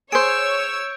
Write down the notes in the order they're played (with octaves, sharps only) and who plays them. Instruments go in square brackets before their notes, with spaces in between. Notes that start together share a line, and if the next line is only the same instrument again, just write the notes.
[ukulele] G#4 C5 [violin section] C#5 [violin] E6 [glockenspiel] G6 D7